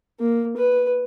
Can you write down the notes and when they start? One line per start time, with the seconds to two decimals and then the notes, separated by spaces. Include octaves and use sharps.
0.20 A#3
0.57 B4